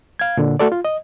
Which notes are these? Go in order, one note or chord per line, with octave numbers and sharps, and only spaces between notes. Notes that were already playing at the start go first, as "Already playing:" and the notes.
F5 G#6
A#2 D3
A3 F#4 A4 D5
F4
D#5